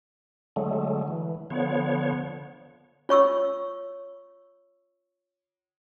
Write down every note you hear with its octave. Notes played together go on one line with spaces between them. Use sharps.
D3 F#3 G#3 A3
E3
D3 F3 B3 C#5
F4 C#5 C#6 E6